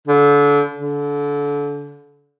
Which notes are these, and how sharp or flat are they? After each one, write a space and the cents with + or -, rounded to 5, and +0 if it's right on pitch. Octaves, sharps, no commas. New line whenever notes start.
D3 -30
D3 -30